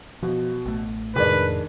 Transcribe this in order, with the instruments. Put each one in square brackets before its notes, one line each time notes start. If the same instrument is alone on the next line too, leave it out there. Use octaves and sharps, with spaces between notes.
[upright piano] B2 [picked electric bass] F3
[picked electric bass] A1 A3
[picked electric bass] F2 A2 C3 [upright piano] D#3 G#3 D4 [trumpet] B4